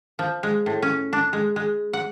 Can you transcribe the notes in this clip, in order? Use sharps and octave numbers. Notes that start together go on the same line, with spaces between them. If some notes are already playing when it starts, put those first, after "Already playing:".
F3
G#3
A2
C#4
D4
G#3
G#3
F#5